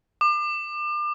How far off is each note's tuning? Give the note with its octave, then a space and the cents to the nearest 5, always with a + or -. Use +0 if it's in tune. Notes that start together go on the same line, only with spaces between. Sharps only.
D6 +35